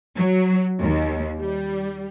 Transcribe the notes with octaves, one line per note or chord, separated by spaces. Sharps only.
F#3
D#2
G3